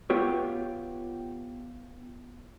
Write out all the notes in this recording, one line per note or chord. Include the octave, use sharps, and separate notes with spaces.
B3 F4 G4 C#5